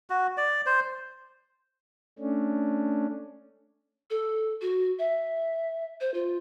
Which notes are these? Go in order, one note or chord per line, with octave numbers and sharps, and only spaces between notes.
F#4
D5
C5
A3 C#4 D4
A4
F#4
E5
C5
F4